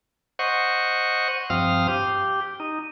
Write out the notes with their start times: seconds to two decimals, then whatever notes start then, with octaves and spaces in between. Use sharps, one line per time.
0.39 C5 D#5 F#5 C#6
1.50 G2 F3 C4 F5 D#6 F6
1.88 G4
2.60 D#4